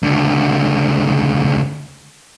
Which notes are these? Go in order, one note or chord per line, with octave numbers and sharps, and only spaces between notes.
C#2 D3